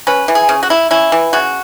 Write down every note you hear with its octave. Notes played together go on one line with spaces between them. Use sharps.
C#4 B4
E3
G#4
C#3
F#4
E4
C#4 E4
E3
C#3 F#4